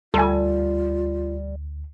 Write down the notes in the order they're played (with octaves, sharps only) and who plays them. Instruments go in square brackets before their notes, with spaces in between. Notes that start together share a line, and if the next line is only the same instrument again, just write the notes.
[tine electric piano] D2 [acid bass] G3 [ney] F4 [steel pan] A4 G#5